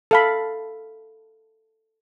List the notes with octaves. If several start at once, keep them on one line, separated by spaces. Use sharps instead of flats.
A4 F5 B5